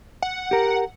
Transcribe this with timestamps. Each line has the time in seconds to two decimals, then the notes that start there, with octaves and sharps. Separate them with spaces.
0.22 F#5
0.51 G4 A#4